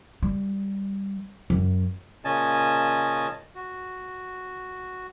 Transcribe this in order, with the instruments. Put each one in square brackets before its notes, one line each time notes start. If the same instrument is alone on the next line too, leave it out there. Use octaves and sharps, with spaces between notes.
[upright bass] G3
F#2
[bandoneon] A#2 C#3 C#4 D#5 G#5 A5
F#4